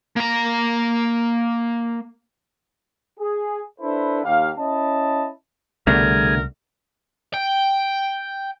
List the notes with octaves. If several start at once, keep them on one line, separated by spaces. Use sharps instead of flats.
A#3 A#5
G#4
D4 E4 A4 B4 C5
D#2 G4 F5
C#4 E4 D#5 A5
C2 B2 D3 G3 A3 G#4 A#4
G5